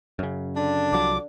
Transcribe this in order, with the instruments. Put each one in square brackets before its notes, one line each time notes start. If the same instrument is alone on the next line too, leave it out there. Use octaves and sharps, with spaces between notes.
[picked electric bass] F#2 C#3
[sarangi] D3 [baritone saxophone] D4
[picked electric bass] C2 F3 F#3 [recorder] D6